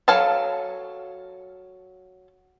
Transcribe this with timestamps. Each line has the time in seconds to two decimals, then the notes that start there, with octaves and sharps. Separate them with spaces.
0.08 F#3 A4 F5 G#5 A5